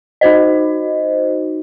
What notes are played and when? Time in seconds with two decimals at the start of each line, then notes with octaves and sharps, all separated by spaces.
0.21 D#4 F#4 C5 D#5